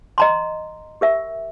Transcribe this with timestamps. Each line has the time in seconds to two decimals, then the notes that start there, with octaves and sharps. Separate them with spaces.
0.18 D#5 A#5 C6
1.01 G4 A#4 E5